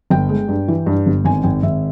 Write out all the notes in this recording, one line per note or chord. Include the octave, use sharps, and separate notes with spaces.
G1 G5
G#3
G2
E3
G2
G1
G#1 G#5
G#1 G5
G#1 E5